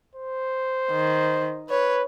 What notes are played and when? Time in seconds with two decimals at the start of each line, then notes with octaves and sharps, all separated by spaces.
0.15 C5
0.92 D#3
1.69 B4 C#5